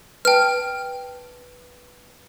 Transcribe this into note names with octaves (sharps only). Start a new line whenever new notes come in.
B4 G5 A5 F6